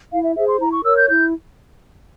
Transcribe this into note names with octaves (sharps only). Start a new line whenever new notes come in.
E4 F5
E5
G#4 C5 E5
C6
E4 A#5
C#6
A#4 C#5 E6
G6
E4 G6